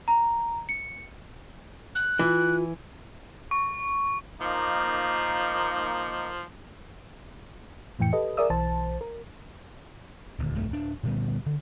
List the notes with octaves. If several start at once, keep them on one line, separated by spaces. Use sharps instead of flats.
A#5
C#7
F#6
E3 F4
C#6
F3 A#3 D#4
F2 A2 E3 G5 C#7
G4 A4 B4 D#5
G#4 A#4 D5 E5 D#6 E6
B1 E3 C5 A5
A#4
D#1 D2
E1 B1 G2 A3
D1 D4
A#2 D3 G3 B3
D3